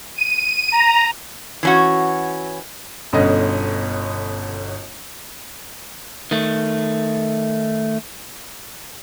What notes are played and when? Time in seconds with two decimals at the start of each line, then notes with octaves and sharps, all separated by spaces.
0.16 D#7
0.72 A#5
1.63 E3 C#4 F#4
3.13 G1 B2 D3 C#4 D#5
6.31 D#3 A3